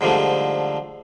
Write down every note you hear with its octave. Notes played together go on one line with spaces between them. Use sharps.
G#2 D3 F3 G3 A3